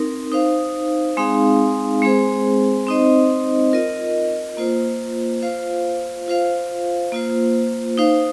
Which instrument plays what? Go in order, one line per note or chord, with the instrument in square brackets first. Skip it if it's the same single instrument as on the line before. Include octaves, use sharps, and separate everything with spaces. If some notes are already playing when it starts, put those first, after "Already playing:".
Already playing: [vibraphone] C4 D#4 A#4
D#4 C5 F5
G#3 C4 D#4 G#4 F5
G#3 C4 G#4 C5
C4 D#4 C5 D#5
F4 A#4 D#5
A#3 F4 C5
F4 C5 F5
F4 C5 F5
A#3 F4 C5
D#4 C5 F5